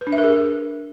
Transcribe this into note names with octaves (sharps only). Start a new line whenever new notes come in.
B4
D4
E5
A#4
G#4